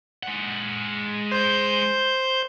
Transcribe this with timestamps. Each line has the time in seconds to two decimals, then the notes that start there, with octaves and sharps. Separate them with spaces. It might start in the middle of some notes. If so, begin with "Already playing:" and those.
0.23 G#3 F#5
1.32 C5 G6